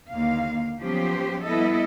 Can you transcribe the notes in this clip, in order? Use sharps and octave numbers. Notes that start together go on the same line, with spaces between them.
D#2 D3 A#3 F5
F3 F#3 B3 C#4 G4 C5
G3 B3 E4 A4 D#5